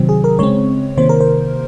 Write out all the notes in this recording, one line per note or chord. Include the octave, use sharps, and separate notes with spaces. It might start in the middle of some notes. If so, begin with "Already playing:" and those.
Already playing: C3 D#3 F#3 C4
G#4
A#4
C#3 G#3 C4 C#5
C3 D#3 A#3 C5
A#4
C5